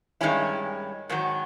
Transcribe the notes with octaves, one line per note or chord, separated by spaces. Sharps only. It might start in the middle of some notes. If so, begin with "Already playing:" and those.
G2 D#3 G#3 C#4 E4
G#2 D#3 F#3